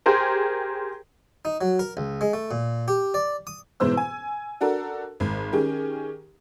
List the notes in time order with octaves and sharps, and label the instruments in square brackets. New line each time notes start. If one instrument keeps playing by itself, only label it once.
[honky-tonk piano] G4 G#4 A#4 C5
[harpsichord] D#4
F#3
A#4
C#2
G#3
A3
A#2
G4
D5
D#6
[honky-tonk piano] G#2 B2 E3 C5 E6
G#5
D4 F#4 A4 A#4
G#1
D#3 C#4 G4 G#4